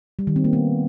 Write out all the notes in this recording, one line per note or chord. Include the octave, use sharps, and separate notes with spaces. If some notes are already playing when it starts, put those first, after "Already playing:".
G3
D#3
C4
A#3
B3